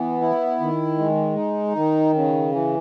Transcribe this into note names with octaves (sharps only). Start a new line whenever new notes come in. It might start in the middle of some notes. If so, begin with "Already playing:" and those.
Already playing: E3 B3
E4
D#3
G#3
D#4
D#3
C#3
E3